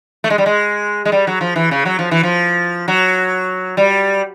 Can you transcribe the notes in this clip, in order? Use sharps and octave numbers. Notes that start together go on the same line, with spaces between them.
A3
G#3
G3
G#3
G#3
G3
F#3
F3
E3
C#3
F#3
F3
E3
F3
F#3
G3